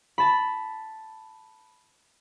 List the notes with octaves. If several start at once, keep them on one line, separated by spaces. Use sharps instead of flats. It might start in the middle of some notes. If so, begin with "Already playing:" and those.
A5 B5